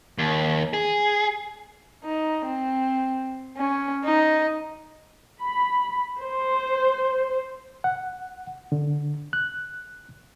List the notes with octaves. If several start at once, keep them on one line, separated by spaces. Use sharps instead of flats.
D#2
G#4
D#4
C4
C#4
D#4
B5
C5
F#5
D3
F#6